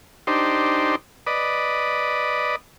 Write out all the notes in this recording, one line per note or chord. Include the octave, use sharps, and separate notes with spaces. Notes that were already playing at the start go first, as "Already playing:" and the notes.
D4 D#4 G4 C5
B4 D5 D#5